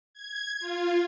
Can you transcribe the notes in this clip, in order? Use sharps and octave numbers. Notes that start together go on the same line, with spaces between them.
G#6
F4